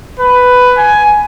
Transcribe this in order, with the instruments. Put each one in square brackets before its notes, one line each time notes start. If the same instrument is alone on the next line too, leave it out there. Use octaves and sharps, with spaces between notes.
[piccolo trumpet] B4
G#5